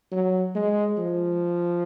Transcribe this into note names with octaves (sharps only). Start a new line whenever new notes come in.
F#3
G#3
F3